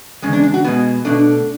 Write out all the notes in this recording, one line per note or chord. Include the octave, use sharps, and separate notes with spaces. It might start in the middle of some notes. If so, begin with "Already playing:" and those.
E2 C#3 G#3 C#4
D4
D4
F#4
B2 G#3 B3 F#4
B2 A3 D4